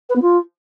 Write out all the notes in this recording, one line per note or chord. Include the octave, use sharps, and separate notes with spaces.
B4
B3
F4